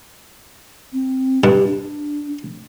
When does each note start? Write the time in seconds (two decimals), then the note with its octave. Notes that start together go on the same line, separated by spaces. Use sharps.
0.93 C4
1.44 G2 G4
1.67 D4